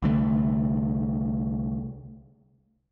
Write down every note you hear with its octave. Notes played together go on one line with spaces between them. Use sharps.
C2 D3 A3